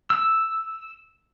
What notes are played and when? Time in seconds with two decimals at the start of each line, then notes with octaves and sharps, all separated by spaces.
0.10 E6